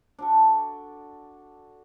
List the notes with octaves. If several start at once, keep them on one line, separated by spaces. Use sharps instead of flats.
D4 F#4 A4